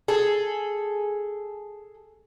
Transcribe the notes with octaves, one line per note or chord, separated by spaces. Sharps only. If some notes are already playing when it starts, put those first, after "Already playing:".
G#4 A4